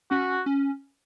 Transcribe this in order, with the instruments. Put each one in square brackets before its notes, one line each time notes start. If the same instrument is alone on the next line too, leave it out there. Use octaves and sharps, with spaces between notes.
[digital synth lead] C#4 [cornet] F#4
[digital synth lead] C#4